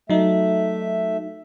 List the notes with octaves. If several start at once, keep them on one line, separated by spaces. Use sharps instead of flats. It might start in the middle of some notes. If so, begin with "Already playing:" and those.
F#3 A3 D#4 E5